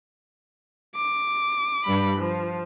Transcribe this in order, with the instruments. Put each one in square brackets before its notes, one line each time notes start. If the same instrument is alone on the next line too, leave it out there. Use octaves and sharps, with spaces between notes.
[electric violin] D6
[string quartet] G2 G3 B5
F3